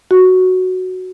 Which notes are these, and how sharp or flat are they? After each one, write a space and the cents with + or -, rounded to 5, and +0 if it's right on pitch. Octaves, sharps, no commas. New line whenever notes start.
F#4 +0